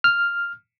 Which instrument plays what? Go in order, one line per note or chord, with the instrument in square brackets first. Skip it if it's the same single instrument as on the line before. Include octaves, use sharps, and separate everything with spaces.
[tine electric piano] F6